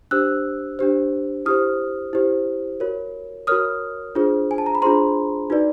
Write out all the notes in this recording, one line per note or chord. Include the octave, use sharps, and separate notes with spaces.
D4 G4 C5 E6 F#6
D4 G4 C5
E4 G4 C5 D#6 F6
E4 G4 C5
F#4 A#4 C#5
F#4 A#4 C#5 D#6 F6
D4 F4 G#4 C5
G#5
A5
A#5
B5
D4 F4 G#4 C5 A#5 C6
D#4 F#4 B4 D5